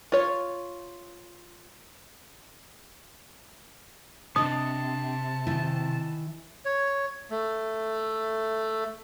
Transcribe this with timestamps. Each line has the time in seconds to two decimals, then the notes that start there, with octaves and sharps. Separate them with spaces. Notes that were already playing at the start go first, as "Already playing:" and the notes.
0.12 F4 C#5
4.36 C3 D4 D#5 A5 D#6
5.47 D#3 E3 E4
6.65 C#5
7.30 A3